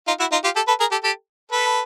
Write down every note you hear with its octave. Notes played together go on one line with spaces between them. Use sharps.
D#4 F4
E4 F#4
D#4 F4
F4 G4
G4 A4
A4 B4
G#4 A#4
G4 A4
G4 A4
A4 B4